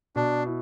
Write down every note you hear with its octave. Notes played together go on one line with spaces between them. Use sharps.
B2 D4
E4